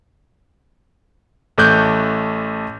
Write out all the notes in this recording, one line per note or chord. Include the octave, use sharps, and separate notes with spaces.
A1 A3 D6 F#6 G6